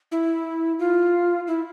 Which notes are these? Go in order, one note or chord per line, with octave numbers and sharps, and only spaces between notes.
E4
F4
E4